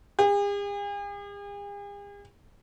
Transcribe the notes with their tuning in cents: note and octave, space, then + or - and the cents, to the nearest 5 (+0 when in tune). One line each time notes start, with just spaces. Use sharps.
G#4 -45